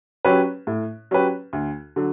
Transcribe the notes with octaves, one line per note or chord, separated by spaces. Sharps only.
F#3 C#4 G4 B4
A2
F#3 C#4 G4 B4
D2
D3 F#3